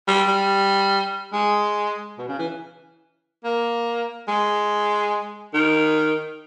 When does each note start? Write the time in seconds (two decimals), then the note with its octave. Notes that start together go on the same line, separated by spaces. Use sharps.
0.08 G3
0.28 G3
1.33 G#3
2.18 B2
2.29 C#3
2.39 E3
3.44 A#3
4.28 G#3
5.54 D#3